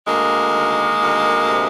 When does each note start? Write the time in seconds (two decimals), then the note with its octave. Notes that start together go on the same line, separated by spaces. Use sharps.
0.07 D2 G#3 A#3
0.54 D#3
0.99 D2
1.45 C3